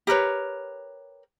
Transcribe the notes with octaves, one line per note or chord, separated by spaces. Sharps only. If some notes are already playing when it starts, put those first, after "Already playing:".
G4 A#4 B4 C#5